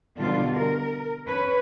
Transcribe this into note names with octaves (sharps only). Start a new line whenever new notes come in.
B2 D3 G3 F4
A#4
C#4 B4 C#5